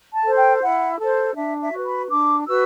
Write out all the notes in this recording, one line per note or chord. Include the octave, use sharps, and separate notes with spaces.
A5
A4 C5
G5
E4 F#5
A4 C5
D4 E5
E5
F#4 B4
B5
D4 D6
F#4 B4 E6